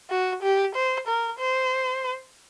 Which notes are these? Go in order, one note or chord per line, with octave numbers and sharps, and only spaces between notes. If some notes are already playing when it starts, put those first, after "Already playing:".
F#4
G4
C5
A#4
C5